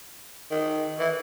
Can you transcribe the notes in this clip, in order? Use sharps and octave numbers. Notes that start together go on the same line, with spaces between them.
D#3
E3